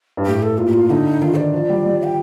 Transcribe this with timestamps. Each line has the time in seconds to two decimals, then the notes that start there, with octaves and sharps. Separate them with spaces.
0.17 G2
0.26 A2 G4
0.43 A4
0.58 A#2 F4
0.66 G4
0.73 F4
0.90 D3 D#4
1.21 D#3 F4
1.37 D5
1.54 F3
1.69 G3
1.85 G3
2.03 G5